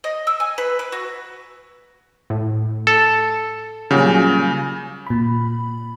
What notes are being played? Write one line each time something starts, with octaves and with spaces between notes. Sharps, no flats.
D#5
E6
G#5
B4
B4
F#4
A2
A4
A#2 C#3 F#3 G3
A#2 B5